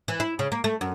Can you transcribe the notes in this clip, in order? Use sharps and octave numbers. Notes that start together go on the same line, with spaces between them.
E3
E4
C#3
A#3
A3
F#2